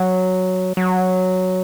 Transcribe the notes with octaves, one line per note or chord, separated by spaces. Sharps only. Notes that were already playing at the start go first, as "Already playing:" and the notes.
Already playing: F#3
F#3